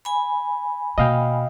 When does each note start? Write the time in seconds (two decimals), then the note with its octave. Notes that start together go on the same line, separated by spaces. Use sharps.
0.05 G#5 B5
0.98 B2 A#3 D#5 F5 G5